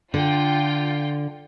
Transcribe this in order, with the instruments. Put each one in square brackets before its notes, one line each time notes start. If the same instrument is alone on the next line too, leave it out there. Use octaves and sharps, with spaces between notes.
[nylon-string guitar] D3 [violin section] F4 G5